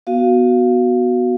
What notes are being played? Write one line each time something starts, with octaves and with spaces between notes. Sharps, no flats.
B3 F#4 F5